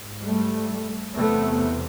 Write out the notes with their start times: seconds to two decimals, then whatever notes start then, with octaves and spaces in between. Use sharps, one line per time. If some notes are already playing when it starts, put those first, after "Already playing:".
Already playing: G#2
0.22 G3 A3
1.14 E2 C3 A3 B3